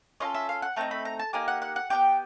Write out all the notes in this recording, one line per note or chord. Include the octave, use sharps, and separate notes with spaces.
C#4 F4 A4 D#5
E5
F5
F#5
A3 C4 D#4 A#5
B5
A#5
A5
A#3 D#4 G4 G#5
F#5
F#5
F#5
B3 D4 G4 G5